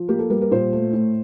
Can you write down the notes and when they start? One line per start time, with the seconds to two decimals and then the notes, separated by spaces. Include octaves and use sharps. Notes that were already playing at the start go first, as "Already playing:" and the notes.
Already playing: F3
0.08 A#3 G4
0.19 A4
0.30 G3 A#4
0.41 A#4
0.51 A#2 C5
0.73 A3
0.93 A2